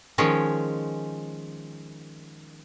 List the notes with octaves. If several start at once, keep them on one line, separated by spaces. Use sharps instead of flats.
D#3 F3 G#3 C#4